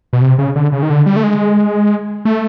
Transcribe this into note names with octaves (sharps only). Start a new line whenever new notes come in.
B2
C3
C#3
D3
C#3
D#3
D3
G3
A3
G#3
A3